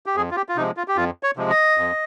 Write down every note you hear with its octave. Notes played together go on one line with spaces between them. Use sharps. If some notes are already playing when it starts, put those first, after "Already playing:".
G4
F2 G#4
F4
G4
F4
C3 F3 G#3 D#4
F4
G4
F2 F4
C#5
C3 F3 G#3
D#5
F2